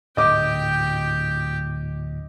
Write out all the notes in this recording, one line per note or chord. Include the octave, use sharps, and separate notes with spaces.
D1 G#2 G4 D#5 G5 D6